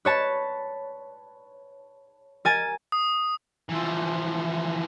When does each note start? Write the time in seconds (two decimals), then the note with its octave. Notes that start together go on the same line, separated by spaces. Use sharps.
0.05 B4 C#5 A5
2.45 A#4 G#5 A6
2.92 D#6
3.69 E3 F3